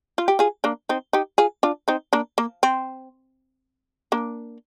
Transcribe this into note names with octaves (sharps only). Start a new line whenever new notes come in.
F4
G4
F4 G#4
A#3 D4
C4 D#4
D#4 G4
F4 G#4
D4 F4
C4 D#4
A#3 D4
A#3
C4
A#3 D4